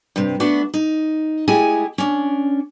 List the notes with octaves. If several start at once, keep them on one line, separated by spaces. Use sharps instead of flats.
G2 C3
A3 B3 D4 F#4
D#4
G#3 A3 E4 G4 G#4 G#5
C#4 D4